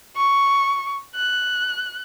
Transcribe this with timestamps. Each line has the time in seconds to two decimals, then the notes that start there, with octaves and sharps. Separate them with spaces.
0.16 C#6
1.15 F#6